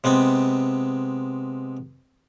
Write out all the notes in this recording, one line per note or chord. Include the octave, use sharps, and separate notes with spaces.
C3 G#3 B3 C4